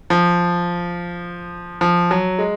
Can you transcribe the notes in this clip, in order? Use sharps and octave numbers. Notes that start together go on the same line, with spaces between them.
F3
F3
F#3
G#3